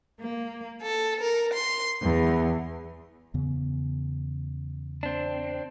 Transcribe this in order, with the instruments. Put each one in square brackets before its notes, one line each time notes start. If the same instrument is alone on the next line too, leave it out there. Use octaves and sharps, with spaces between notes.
[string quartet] A#3
A4
A#4
C6
E2
[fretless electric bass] E2 C#3 B3
[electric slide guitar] C4 D4